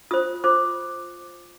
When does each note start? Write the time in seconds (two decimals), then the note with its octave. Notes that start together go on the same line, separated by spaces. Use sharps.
0.11 F4 C5 D#6
0.44 F4 C5 D6